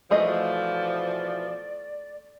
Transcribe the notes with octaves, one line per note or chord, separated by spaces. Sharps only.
B2 E3 F3 A3 G#4 D5 D#5